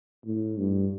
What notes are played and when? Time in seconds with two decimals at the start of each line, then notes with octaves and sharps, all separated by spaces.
0.26 A2
0.57 G2